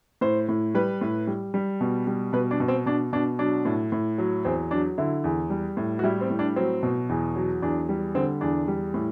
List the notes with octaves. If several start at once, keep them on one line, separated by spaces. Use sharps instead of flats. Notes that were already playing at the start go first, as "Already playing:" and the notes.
A2 C5
A2
G3 B4
A2
G3
G3
B2
G3
B2 B4
D4
B2
C4
B2 D4
B2 D4
F#3 D4
A2
A2
F#3
E2 C4
F#3 D4
D3 E4
E2
G3
A2
F#4
G3 E4
C4
A2
D4
F#3 C4
B2
E2
F#3
E2 D4
G3
D3 C4
E2 D4
G3
A2